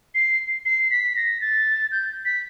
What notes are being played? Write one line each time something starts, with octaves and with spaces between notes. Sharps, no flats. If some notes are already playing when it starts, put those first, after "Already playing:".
C7
C7
B6
A#6
A6
G6
B6